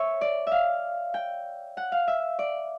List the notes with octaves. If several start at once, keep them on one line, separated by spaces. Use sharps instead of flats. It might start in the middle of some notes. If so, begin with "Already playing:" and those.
Already playing: C#5 E5
D5
E5 F5
G5
F#5
F5
E5
D5